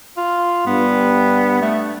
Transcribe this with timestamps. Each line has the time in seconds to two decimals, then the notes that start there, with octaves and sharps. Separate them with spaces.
0.17 F4
0.66 G2 B3
1.62 A3